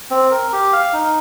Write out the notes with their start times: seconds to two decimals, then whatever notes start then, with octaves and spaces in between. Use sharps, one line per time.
0.11 C4
0.31 A#4
0.52 G4
0.73 F5
0.93 D#4